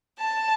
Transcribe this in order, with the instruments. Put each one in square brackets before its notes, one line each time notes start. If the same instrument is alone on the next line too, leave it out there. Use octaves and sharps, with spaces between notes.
[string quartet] A5